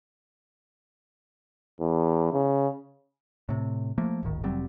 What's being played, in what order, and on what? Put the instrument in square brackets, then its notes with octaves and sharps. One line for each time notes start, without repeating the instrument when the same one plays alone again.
[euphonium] E2
C#3
[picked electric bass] A2 C3
F3 A3 A#3
D1 G#1 D#3
F1 F#3 G3 C4